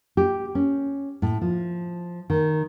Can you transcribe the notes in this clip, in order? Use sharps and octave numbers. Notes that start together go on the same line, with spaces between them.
G4
C#4
A2
F3
D#3